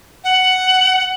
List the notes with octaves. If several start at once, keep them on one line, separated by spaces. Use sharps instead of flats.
F#5